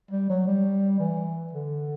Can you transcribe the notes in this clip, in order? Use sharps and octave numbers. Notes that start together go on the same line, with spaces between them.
G3
F#3
G3
E3
D3